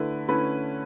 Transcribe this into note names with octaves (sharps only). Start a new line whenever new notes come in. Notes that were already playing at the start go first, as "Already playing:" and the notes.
Already playing: D3 A3 E4 B4
D3 A3 C#4 E4 B4